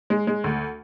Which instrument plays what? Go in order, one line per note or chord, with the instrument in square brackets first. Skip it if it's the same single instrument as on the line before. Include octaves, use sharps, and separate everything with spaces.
[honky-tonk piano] G#3
G#3
D2